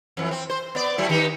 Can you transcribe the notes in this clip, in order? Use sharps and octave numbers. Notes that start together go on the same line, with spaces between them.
F2 E3
C4
C5
B3 D5
F#3 A3 E4
D#3 D#4 G4